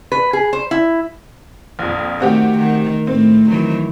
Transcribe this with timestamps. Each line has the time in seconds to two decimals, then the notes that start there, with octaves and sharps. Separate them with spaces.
0.12 B4
0.33 G#4
0.53 C5
0.71 E4
1.79 A#1 F2
2.20 D#3 A3 C4 F#4 G4
2.58 D#3
3.07 A2 A3 C4
3.49 D#3 E3 F#3